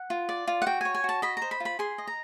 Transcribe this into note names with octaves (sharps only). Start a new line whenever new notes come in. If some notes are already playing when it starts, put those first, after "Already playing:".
Already playing: F#5
F4
D5
F4
F#5
F#4 G5
C#5 G#5
G#5
F#4 A5
D#5 B5
C5 A#5
B5
F4
B5
G#4 C6
D#5
A#5